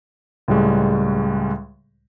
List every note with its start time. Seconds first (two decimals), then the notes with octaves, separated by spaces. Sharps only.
0.48 C#2 A2 G3 G#3